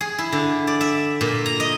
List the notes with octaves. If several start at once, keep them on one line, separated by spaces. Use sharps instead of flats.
G#4
E4
D3
D5
E5
A#2
A#5
D#5